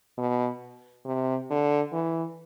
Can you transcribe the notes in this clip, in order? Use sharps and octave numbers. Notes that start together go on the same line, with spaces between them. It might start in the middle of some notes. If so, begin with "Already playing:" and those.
B2
C3
D3
E3